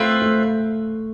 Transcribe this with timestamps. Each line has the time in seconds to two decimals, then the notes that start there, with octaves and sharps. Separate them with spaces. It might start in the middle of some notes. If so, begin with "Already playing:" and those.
Already playing: A3 C4 F4 B4 E5
0.22 A3